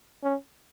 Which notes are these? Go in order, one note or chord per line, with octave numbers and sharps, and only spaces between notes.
C#4